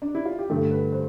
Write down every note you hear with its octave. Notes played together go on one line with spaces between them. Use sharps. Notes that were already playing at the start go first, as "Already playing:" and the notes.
D4
E4
F4
G4
G2 D3 A3 A4
B4
C5